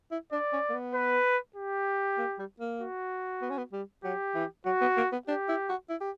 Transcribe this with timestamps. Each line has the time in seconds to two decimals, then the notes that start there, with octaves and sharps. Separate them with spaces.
0.12 E4
0.32 D4 D5
0.53 C#4
0.69 A#3
0.74 B3
0.94 B4
1.56 G4
2.18 A#3
2.39 G3
2.60 A#3
2.80 F#4
3.42 B3
3.50 C#4
3.58 B3
3.73 G3
4.04 F#3 G4
4.35 E3
4.66 F#3 F#4
4.81 B3
4.97 A#3
5.12 B3
5.27 D4 G4
5.49 E4
5.69 F#4
5.89 E4
6.01 G4